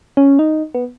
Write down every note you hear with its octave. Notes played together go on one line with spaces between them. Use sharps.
C#4
D#4
B3